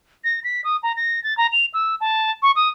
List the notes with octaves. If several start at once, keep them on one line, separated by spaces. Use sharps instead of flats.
A#6
B6
D#6
A#5
A#6
A6
A#5
F7
E6
A5
C#6
D#6